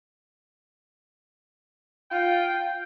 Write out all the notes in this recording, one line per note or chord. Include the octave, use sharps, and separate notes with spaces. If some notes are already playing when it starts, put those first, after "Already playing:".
F4 G5